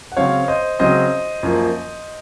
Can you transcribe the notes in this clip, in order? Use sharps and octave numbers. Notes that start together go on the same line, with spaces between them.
F#5
C#3 F#3 C4 C#5 F5
C5 D#5
C#3 F#3 C4 C5 D#5
F#2 F3 A#3